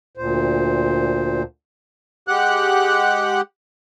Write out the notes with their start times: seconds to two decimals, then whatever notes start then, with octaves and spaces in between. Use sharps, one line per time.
0.17 D2 A#2 C5
2.28 G#3 G4 F#5 F#6